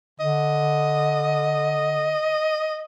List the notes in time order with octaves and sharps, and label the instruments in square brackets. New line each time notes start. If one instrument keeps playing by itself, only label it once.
[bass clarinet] D3 [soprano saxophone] D#5